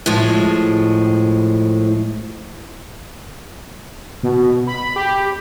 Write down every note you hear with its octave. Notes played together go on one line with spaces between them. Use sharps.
A2 F3 G#3
B2
B5
G4